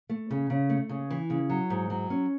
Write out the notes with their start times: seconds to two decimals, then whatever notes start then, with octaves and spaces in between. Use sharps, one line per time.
0.09 A3
0.31 C#3
0.50 C#3
0.69 A3
0.89 C#3
1.11 E3
1.30 C#3
1.50 F#3
1.70 G#2
1.90 F#3
2.10 C#4